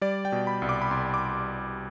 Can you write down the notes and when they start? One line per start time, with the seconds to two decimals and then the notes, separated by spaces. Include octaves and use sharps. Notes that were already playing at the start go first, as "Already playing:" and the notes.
0.01 G3 D5
0.25 G5
0.32 B2
0.47 B5
0.62 C2
0.69 D6
0.82 B5
0.91 C2 C6
1.14 D6